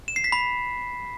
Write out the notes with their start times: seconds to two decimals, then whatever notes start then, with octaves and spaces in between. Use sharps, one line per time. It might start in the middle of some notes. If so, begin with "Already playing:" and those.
0.08 E7
0.16 C7
0.24 B6
0.32 B5